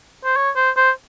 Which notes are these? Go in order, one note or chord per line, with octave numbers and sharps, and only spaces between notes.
C5
C#5
C5
C5